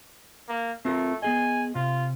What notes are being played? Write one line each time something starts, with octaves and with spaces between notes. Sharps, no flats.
A#3
A3 C4 F4 A#4
B3 G#4 D#5 G#5
C3 F4